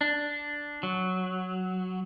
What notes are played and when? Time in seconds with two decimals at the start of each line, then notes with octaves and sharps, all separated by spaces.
0.01 D4
0.83 F#3